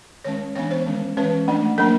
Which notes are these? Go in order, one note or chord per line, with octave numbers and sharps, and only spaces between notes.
D#3 G#3 C#4 C#5
E3 G#3 B3 D4 C#5
C5
D#3 G#3 C#4
E3 G#3 C#4 B4
F3 A3 D4
F#3 A#3 D4 A#4